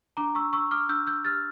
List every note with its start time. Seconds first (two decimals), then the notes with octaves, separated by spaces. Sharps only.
0.17 D4 A#5 D6
0.35 C#6 E6
0.53 D4 C#6 E6
0.71 D6 F6
0.89 D4 E6 G6
1.07 E6 G6
1.25 G4 F6 A6